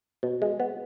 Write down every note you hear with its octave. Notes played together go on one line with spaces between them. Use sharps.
B2
G#3
B3